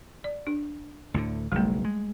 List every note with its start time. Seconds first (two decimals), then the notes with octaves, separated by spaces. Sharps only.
0.24 D5
0.47 D4
1.14 D2 A2 D3
1.52 F#1 B1 G3 A3
1.84 G#3